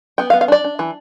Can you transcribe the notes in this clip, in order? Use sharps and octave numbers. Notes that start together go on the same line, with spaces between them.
B3 G5
F5
B3
F5
D4 D5
D4
E3